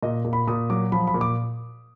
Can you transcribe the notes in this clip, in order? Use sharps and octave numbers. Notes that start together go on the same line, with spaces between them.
A#2 D#5
A#2
B5
A#2 D#6
F#3 D6
F3 B5
B5
A#2
D6